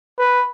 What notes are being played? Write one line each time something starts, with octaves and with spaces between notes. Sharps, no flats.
B4